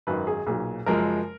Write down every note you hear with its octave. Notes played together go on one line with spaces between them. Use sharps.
G#1 F#2 D#3 B4
G#4
B1 A#2 F#3 G#4
F#1 F#2 F3 G#3 A#4